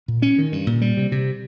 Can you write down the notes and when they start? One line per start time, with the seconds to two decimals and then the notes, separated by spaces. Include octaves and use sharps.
0.08 A#2
0.22 C#4
0.38 D#3
0.52 G2
0.67 A#2
0.81 G3
0.97 C3
1.12 C3